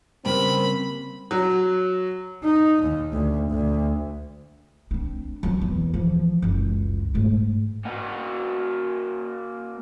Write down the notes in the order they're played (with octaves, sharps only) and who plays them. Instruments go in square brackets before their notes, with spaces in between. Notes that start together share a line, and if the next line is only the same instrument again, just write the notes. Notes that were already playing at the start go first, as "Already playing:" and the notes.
[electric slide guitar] C#3 G3 A#3 [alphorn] C4 [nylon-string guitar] A#4 B4 G5 [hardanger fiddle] B5
[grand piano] F#3
[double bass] D#4
D#2
D2
D2
[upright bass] C4 D4
F#3 C4
E2
E3 F3
F#1 C#2
G#2 A3
[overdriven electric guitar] A#3 F#4